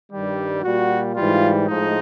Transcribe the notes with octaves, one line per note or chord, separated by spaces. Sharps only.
G2 D#3 G3
A#2 G3 F#4
G#2 E3 G3 F4
A2 F3 G#3 D#4